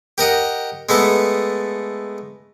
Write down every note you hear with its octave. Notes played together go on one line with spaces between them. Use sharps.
G4 A#4 D#5 F#5
G#3 A3 B3 A4